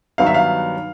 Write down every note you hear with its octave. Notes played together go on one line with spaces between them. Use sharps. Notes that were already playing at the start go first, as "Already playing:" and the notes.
G2 D#3 F#3 B3 F5
E5
F5